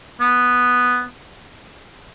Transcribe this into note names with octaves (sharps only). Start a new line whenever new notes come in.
B3